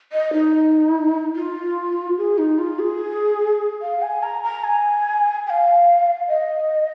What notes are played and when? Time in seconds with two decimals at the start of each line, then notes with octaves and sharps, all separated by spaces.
0.13 D#5
0.33 D#4
1.36 F4
2.18 G#4
2.38 D#4
2.59 F4
2.79 G#4
3.82 F5
4.02 G#5
4.23 A#5
4.43 A#5
4.64 G#5
5.47 G#5
5.50 F5
6.28 D#5